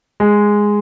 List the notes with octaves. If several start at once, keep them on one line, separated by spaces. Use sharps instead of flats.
G#3